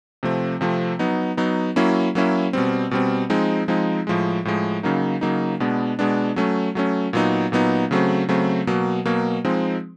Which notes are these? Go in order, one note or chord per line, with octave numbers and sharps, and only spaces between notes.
C3 F3 A3 C4
C3 F3 A3 C4
F#3 B3 D#4
F#3 B3 D#4
F#3 A#3 C#4 E4
F#3 A#3 C#4 E4
B2 G3 C4
B2 G3 C4
F3 G#3 C4 D#4
F3 G#3 C4 D#4
A2 F3 G#3
A2 F3 G#3
C#3 F#3 A#3 D#4
C#3 F#3 A#3 D#4
B2 G#3 B3 D4
B2 G#3 B3 D4
F#3 A3 C#4
F#3 A3 C#4
A#2 F#3 B3 D#4
A#2 F#3 B3 D#4
C#3 F#3 A3 C4
C#3 F#3 A3 C4
B2 F#3 A#3
B2 F#3 A#3
F3 G#3 C4 D#4